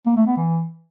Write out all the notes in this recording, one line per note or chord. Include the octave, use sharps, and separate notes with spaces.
A#3
A3
B3
E3